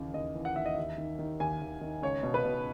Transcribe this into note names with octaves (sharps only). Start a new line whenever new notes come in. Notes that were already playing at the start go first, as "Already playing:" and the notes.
Already playing: D#2 C#3 E3
D#2 D#5
E3
F#5
D#2 E5
D#5
D#2 E5
D#3
D#3
D#2 G#5
D#2
D#3
C#2 C#5
B2
B4
B2